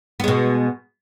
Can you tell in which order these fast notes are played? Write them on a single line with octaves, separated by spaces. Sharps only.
B3 G#3 B2